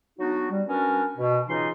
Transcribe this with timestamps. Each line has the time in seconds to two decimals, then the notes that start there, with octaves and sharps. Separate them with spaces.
0.19 F#3 B3 D4 D#4 F#4
0.51 G3
0.68 B3 C#4 D4 F#4 A#4
1.18 B2
1.49 C#3 E3 D#4 F4 D#5 C6